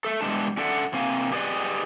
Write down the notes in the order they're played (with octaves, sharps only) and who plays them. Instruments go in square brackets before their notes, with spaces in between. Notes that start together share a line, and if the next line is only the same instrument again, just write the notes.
[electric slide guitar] A4 E5
B2 E3 G3 G#3 D4 A5
C#4 D4 A4 D5 E5 F#5
C3 A#3 C4 F5 G#5
G4 G#4 B4 D5 D#5